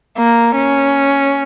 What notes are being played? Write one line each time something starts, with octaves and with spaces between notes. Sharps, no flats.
A#3
C#4